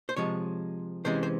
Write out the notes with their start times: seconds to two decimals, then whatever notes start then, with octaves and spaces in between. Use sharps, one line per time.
0.09 C5
0.17 C3 F3 G#3 C#5
1.05 C3 E3 G#3 C#4 C5
1.23 C5